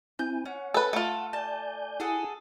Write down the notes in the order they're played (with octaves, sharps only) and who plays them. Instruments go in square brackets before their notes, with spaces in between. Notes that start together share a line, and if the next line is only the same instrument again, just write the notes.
[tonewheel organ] C4 E4 G#5 [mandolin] G6
[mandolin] C#4 [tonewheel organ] F#5
[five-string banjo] A4 B4
[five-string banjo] A3 F4 [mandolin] A4
[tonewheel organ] D5 G#5 G6 [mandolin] A5
[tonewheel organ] E4 [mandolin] G#4 A4 F#5